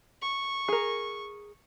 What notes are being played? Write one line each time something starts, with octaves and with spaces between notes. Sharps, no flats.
C#6
G#4 A#4